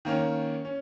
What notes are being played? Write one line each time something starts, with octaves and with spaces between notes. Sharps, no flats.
D#3 A#3 C#4
C#4